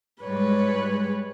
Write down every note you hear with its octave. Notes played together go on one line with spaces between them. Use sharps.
G#2 G3 G#3 B4 C#5